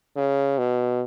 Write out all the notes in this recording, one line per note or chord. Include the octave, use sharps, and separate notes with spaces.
C#3
B2